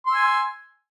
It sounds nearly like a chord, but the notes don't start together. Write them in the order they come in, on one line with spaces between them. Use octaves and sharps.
C6 E6 G#5